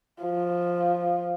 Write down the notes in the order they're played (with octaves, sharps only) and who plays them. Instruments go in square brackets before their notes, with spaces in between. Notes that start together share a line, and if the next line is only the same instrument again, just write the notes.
[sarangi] F3